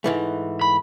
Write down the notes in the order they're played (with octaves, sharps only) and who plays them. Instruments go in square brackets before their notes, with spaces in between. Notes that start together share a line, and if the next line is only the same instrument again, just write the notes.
[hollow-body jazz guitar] G#2 E3 A3
[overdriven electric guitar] B5